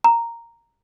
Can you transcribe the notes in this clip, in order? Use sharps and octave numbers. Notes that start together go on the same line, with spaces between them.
A#5